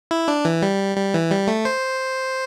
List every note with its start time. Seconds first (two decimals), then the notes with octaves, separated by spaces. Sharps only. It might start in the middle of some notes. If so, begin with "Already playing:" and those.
0.11 E4
0.28 D4
0.45 E3
0.62 G3
0.97 G3
1.14 E3
1.31 G3
1.47 A3
1.65 C5